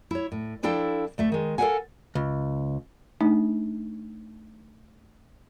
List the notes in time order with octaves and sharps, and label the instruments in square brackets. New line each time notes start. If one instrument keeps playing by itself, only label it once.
[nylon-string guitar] E4 C#5
A2
F3 D4 E4 A4 F5 G5
D2 A3 E5
D#3 G#3
A4 A#4 C5 F5 F#5 G#5
[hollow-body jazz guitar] C#2
[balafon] A3 D4 D#4